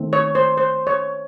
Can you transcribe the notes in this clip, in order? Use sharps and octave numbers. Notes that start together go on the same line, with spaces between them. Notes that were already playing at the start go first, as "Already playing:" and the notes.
Already playing: D#3 A3 C4
C#5
C5
C5
C#5